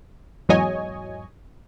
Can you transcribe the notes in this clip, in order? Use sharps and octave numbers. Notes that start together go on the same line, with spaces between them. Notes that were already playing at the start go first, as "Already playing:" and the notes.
E2 G#2 F#3 C#5 D#5 G#5